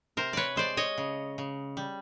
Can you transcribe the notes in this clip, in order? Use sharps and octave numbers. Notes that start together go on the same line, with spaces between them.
C3 A#4 C5
B4 C#5 D5
G#3 C5 D5
C#5 D#5
C#3
C#3
G3